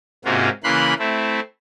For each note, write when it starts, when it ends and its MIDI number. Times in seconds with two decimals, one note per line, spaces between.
0.25 0.49 44
0.25 0.49 48
0.25 0.49 58
0.25 0.49 61
0.25 0.49 65
0.25 0.49 66
0.64 0.94 49
0.64 0.94 52
0.64 0.94 58
0.64 0.94 83
0.64 0.94 84
0.64 0.94 90
0.99 1.40 57
0.99 1.40 60
0.99 1.40 64